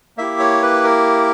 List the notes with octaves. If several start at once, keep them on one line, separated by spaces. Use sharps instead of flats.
A#3 E4 G4 E5
C#5
B4
A#4